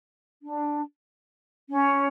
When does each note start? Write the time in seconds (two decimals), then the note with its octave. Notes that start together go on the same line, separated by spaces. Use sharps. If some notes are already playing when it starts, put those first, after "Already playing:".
0.43 D4
1.70 C#4